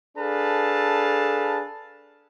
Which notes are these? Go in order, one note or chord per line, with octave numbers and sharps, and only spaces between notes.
D4 G#4 A4 B4 F5 A5